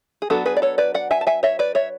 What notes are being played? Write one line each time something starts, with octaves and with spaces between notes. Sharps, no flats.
G#4
F#3 B3 D4 F#4 A4
G#4 B4
D5
A4 C#5
B4 D5
D5 F#5
E5 G#5
A5
E5 G#5
C#5 E5
B4 D5
C#5 E5